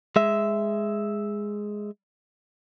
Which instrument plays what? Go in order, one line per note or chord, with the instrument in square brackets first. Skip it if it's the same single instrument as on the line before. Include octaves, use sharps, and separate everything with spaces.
[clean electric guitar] G#3 E5